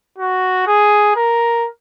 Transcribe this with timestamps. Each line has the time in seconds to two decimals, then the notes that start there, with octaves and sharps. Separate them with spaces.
0.18 F#4
0.67 G#4
1.16 A#4